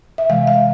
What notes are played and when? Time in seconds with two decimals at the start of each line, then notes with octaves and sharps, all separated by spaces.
0.18 E5
0.29 C3 E3 G#3 F5
0.47 F5